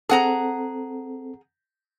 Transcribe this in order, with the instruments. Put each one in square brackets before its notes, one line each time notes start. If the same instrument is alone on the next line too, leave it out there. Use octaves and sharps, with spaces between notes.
[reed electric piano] C4 A4 [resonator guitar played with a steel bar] G#4 F#5 A#5